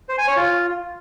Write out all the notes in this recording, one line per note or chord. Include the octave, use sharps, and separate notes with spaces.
C5
G#5
C#5
F4